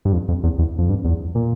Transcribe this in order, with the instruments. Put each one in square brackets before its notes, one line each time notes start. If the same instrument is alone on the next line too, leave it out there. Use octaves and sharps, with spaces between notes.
[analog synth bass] G2
F2
F2
E2
E2
F2
G2
E2
A#2